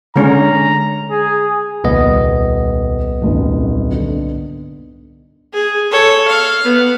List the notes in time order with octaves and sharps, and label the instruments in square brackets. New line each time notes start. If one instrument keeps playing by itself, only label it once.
[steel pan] D3 G#3 C#4 [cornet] A#5
[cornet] G#4
[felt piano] D#1 [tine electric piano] C2 B3 D#5
[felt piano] D#1 G#1 F#2
D3
[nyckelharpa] G#4
A4 C#5
F5
B3